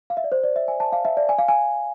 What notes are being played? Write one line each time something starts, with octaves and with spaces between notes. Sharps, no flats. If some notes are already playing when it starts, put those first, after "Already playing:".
F5
E5
D5
C5
D5
E5
G#5
A5
F5
E5
D5
G#5
F5
G#5